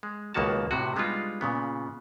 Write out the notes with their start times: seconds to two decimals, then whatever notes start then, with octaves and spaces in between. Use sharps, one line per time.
0.03 G#3
0.34 C#2 B2 D#3 A#3 F#4 A5
0.71 A2 C3 F#4
0.96 G3 G#3 B3 D4 D#4 F4
1.41 A#2 C#3 B3